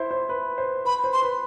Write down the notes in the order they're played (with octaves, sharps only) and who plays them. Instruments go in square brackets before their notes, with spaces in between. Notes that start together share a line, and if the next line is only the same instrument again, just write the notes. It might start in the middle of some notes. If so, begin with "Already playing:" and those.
Already playing: [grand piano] E4 C5
C5
B4
C5
[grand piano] B4 [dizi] B5
[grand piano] C5
[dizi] C6
[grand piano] B4